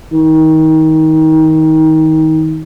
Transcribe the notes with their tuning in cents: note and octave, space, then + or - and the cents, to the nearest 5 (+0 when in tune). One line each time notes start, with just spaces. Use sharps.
D#3 +25